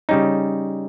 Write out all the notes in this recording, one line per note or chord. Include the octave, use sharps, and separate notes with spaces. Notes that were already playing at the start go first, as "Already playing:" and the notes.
C#3 G3 C#4 D#4